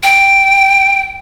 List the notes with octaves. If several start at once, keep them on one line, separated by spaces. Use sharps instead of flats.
G5